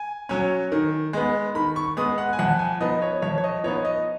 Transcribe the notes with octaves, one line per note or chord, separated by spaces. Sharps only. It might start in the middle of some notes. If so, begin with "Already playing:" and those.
Already playing: G#5
F#3 C#4
D#3
G#3 B3
D#3 B5
C#6
G#3 B3 D#6
F#5
G#5
F2 F#5
G#5
F3 B3 D#4 D#5
C#5
F2 C#5
C#5
D#5
F3 B3 D#4 C#5
D#5